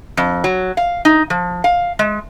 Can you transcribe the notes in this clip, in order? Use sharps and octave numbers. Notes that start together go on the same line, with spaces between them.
F2
F#3
F5
D#4
F3
F5
G#3